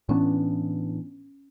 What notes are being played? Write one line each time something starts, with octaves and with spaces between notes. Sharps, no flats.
A2 E3 B3 C#4 D4